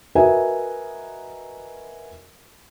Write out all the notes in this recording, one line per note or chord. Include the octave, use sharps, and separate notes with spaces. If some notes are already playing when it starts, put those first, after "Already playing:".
F#4 A#4 B4 D#5 E5 G#5